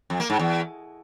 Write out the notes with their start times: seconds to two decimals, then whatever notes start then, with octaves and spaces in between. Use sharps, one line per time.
0.10 F2
0.20 A#3
0.30 G#2
0.39 E2